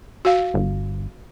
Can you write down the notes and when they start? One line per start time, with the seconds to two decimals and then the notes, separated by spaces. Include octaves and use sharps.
0.25 F#4 F5
0.54 G1